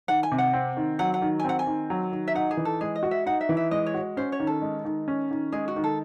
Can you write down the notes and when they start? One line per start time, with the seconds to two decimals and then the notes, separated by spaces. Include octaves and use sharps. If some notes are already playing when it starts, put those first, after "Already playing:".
0.08 D#3 F#5
0.23 G#5
0.31 C3
0.38 F#5
0.53 C4
0.77 D#3
0.99 F#3 F#5
1.14 F#5
1.22 D#3
1.39 G#5
1.44 C4 F#5
1.59 G#5
1.67 D#3
1.90 F#3
2.12 D#3
2.28 E5
2.35 D#4 F#5
2.51 G#4
2.57 E3
2.65 A4
2.81 G#3 G#4
2.95 D#5
3.03 F#4
3.11 E5
3.26 D#4 F#5
3.41 E5
3.49 E3
3.57 E5
3.71 G#3 D#5
3.86 C#5
3.94 F#4
4.17 C#4 C5
4.32 C#5
4.40 D#3
4.47 A4
4.62 G#3
4.85 D#3
5.08 C#4
5.31 D#3
5.52 G#3 G#4
5.68 F#4
5.76 D#3
5.84 A4